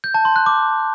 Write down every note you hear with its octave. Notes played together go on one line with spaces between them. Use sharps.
G6
A5
C6
F#6
D6